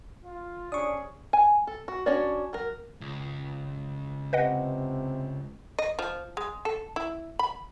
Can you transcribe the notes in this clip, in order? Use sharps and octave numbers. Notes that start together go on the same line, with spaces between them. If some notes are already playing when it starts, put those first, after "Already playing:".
F4
C3 C#4 D4 G#4 C#6 D#6
G#5
A4
F#4
C#4 D4 F#4 C#5 D5
F#3 A#4
C#2
C3 B4 D#5 F#5
D#5
F3
G#3
A4
E4
B5